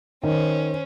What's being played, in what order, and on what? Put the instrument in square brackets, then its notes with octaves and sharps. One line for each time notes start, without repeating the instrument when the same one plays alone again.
[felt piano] D#3 [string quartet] C#4 C5